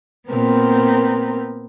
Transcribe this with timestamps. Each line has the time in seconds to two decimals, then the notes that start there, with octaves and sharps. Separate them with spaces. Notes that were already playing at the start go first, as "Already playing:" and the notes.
0.29 A#2 B3 C4 A#4